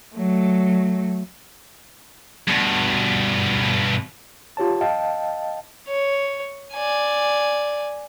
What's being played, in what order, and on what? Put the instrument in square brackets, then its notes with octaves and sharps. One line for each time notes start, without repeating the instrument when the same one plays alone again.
[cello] F#3 A3
[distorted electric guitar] G2 B2
[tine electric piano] F4 G4 C#5 A5
D#5 F5 G5 A5
[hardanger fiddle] C#5
D5 G#5